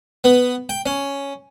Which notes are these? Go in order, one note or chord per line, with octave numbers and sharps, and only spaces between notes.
B3
G5
C#4